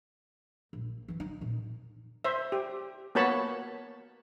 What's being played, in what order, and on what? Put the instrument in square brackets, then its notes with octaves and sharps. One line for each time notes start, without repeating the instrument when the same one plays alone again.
[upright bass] A#1
E3 C4
D#4
F2 A#2
[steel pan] C5 E5
G4
A#3 B3 F#4 C#5 A5 B5